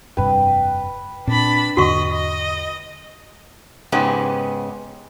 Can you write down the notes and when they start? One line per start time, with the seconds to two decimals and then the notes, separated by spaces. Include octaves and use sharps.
0.17 F1 G2 C3 B4 G5
1.27 A#2 C4 D4 B5
1.77 E2 G#2 D3 F#4 D#5 C#6
2.13 D#5
3.92 G#2 C#3 B3 C#4 G4